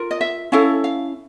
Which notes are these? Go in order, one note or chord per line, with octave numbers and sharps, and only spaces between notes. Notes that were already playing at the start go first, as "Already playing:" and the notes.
Already playing: F4 A#4
D#5
E5
C#4 E4 A4 F5
F5